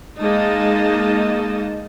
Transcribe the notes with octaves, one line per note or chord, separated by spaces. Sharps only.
G#3 A#3 D#4 D#5 A5